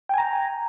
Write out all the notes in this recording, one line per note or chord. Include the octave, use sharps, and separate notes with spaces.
G5 G#5 A#5